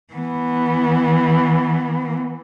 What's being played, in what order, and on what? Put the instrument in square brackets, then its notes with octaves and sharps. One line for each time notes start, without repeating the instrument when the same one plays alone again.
[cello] E3 B3